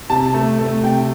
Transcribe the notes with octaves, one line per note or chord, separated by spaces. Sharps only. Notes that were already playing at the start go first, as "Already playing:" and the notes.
C3 A5
A3
A3
C3 G5